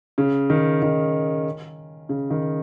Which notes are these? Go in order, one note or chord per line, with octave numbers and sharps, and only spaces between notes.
C#3
D#3
D#3
C#3
D#3